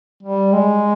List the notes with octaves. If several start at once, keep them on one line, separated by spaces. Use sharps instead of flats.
G3
G#3